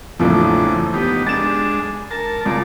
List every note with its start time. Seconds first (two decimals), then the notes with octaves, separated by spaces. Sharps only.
0.20 F#1 E2 A2 F3 D4
0.94 B3 D#4 G4
1.26 G#3 D4 A6 E7
2.11 A#4 A5
2.46 C#2 G#3 D5